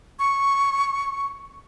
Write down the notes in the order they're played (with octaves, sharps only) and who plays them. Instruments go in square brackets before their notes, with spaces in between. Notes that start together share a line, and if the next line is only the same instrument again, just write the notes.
[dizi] C#6